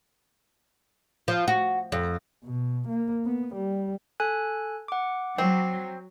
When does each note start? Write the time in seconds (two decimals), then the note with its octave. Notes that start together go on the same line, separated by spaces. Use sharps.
1.28 F3
1.48 F#4
1.92 F2
2.44 B2
2.88 A#3
3.25 B3
3.55 G3
4.20 A4 G#5 F#6
4.88 F#5 D6
5.38 F#3 C4